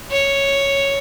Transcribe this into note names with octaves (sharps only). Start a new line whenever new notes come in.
C#5